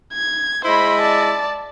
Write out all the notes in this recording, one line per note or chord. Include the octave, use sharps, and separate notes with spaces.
G#6
G#3 E4 C5 D#5 B5
D5 A5